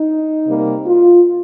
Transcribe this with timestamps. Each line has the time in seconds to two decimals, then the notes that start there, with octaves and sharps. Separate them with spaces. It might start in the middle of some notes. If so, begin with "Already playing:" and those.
Already playing: D#4
0.47 C3 G3 A#3
0.85 F4